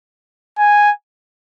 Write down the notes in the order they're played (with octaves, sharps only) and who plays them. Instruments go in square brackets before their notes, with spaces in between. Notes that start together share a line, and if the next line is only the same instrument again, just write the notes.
[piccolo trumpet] G#5